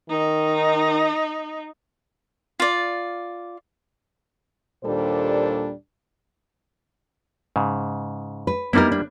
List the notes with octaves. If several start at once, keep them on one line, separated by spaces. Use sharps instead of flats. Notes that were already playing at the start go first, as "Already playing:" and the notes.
D#3 D#4
F4 D5
D#2 A#2 G3 D4 A4 C5
G#2 C#3
B4
G3 A#3 B3 D#4 E4 A#4
D4